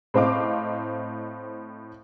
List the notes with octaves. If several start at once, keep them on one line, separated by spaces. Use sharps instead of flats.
A2 C4 C5 D#5 F5 D6